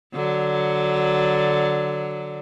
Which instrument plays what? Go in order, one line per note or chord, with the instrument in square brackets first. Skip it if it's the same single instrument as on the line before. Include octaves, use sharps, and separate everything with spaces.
[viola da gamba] D3 F#3